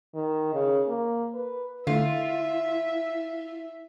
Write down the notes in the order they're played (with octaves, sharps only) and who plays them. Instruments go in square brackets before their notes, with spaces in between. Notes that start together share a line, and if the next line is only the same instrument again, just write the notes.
[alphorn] D#3
C#3
A#3
B4
[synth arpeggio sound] D3 A3 [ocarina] E4 [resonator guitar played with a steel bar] F4 [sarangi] E5